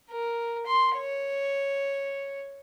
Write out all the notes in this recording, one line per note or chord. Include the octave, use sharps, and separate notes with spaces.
A#4
C6
C#5